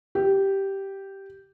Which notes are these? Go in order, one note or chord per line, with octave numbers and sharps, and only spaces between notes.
G4